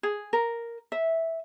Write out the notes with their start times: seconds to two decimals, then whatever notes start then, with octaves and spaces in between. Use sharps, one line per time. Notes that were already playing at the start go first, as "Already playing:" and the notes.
0.03 G#4
0.33 A#4
0.92 E5